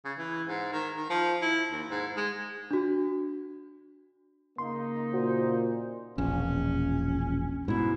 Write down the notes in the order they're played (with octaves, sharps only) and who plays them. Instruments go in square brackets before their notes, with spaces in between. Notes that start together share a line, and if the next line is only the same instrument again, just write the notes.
[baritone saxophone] C#3
E3
G#2
D#3
D#3
F3
E4
D#2
G#2
G#3
[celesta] D4 F#4
[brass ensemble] C#3 A#3 D#4 [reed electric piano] C6
[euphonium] A#2 [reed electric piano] F#4 [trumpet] C5
[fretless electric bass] E1 A#1 [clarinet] C#4
[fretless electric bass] G#2 B2 [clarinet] E4